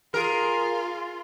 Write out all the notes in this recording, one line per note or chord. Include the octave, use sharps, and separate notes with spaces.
F4 G#4 A#4